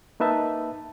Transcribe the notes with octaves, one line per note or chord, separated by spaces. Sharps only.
A#3 D#4 B4 E5 A5